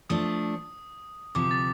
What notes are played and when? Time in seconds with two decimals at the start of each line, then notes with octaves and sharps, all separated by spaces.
0.10 F3 A3 D4 D#6
1.35 D2 C3 F3 D6
1.51 A6